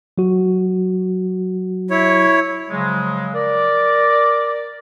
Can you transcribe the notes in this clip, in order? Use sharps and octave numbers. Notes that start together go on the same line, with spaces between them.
F#3 F#4
E4 C#5
C#3 F3 F#3 G#3
A#4 D5